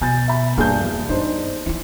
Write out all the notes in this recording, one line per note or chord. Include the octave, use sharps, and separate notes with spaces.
B2 G#5 G6 A6
E5 B5
G2 A#3 F4 G#4 G6
E1
G2 D4 D#4 C5
E3 D4 E4